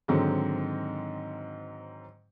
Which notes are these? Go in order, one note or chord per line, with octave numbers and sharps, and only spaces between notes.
G#2 D3 D#3 F#3 C4